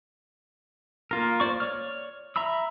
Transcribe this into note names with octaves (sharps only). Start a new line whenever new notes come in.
A#3 F4 A#4
C5 D5 C#6
C#5 D5 F6
E5 A#5 B5 E6